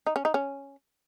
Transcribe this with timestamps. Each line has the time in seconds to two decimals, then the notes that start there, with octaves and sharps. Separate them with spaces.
0.07 D#4
0.16 C#4
0.25 D#4
0.34 C#4